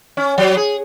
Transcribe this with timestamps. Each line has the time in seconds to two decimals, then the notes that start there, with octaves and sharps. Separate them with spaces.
0.17 C#4
0.38 F#3
0.57 G#4